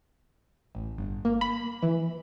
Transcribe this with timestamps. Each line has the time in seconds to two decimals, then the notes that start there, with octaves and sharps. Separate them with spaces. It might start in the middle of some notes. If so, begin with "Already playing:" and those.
0.75 A1
0.98 G1
1.25 A#3
1.41 B5
1.82 E3